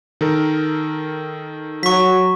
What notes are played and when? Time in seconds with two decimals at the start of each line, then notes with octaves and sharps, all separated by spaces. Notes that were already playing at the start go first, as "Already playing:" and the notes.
0.21 D#3 A4 A#4
1.83 F#3 C#6 B6